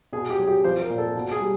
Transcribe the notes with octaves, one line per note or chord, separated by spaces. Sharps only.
B2 G#4
G4
F#3 G#4
G4
F3 C5
A#4
A#2
A4
B2
G#4
G3